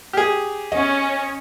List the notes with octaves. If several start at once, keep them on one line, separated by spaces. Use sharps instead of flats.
G4 G#4
C#4 D#5